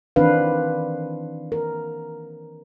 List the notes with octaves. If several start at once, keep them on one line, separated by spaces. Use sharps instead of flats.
D#3 E3 C4 D4 B4 F5
A#4